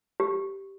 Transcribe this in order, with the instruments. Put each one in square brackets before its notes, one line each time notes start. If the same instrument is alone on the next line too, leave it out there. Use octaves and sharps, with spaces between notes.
[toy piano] G4